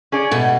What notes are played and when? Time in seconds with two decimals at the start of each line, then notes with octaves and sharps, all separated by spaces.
0.12 C#4 G#4 D5
0.31 B2 A3